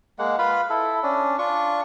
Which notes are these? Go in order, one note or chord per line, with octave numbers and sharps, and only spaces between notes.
G#3 A#3 F#5
F4 B4 F5 B5
E4 A4
C#4 D4
D4 F4 C#6